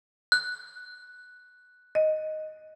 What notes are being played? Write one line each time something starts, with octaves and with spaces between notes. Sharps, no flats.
F#6
D#5